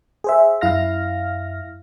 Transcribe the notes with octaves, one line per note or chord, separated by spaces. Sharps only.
G#4 C5 E5
F#2 E4 F5 F6 A#6